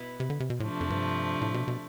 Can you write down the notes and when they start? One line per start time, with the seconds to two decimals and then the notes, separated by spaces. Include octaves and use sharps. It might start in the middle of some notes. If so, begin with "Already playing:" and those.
Already playing: B2 B3 E4 B4
0.20 C3
0.30 D3
0.40 C3
0.50 B2
0.60 A2 C3 F3 A3 D4
0.81 F2
0.90 G2
1.41 A2
1.54 B2
1.68 B2